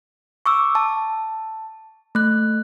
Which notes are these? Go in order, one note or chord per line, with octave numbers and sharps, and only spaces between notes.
C#6 D6 E6
A5
A3 F#6